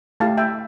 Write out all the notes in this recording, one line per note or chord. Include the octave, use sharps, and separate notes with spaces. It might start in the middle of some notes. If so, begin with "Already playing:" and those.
A3 E4 G4 F5 A5
E5 G5